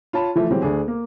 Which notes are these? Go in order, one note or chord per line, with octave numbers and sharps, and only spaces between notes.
F4 C#5 A5 B5
E3 F3 A3
E3 F#3 G#3 C4 G4
D2 D4 G#4
A#3